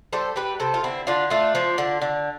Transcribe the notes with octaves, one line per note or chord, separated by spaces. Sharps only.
G3 A4 C5
G3 G4 B4
C3 A4 C5
F4
D3 C4 E4
D3 D4 F4
A3 D4 F4
F3
D3
D3